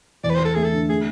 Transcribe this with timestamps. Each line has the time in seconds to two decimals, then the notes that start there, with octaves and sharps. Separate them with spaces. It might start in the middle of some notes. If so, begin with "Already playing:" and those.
0.24 E2 D5
0.30 B4
0.35 C5
0.40 E2
0.45 A4
0.55 A3 G#4
0.64 A4
0.73 D3
0.89 A3 G#4